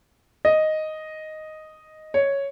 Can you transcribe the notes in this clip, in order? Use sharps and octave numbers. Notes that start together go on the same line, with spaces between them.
D#5
C#5